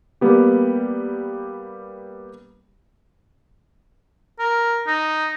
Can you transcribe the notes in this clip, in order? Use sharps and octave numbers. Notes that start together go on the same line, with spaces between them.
G3 A#3 B3 G4
A#4
D#4